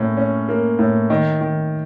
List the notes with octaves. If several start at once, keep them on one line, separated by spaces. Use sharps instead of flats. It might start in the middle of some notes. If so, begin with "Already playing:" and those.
Already playing: A2 A#3 C#4
C#4
A#3
A2
D#3 D#5
D#3